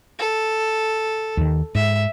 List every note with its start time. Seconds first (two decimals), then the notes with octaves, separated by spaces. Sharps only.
0.19 A4
1.37 D#2 D#3
1.75 G#2 E5